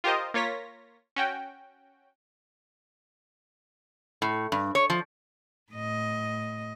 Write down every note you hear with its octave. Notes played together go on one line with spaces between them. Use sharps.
F4 G4 A#4 C5 D#5
A#3 F4 C#5 A#6 B6
C#4 F#4 G5
A2
G2
C#5
F3
A2 D#5